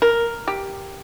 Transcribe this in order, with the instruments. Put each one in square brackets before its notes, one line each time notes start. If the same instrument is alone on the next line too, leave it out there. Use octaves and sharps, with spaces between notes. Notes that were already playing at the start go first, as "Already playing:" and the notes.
[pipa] A#4
G4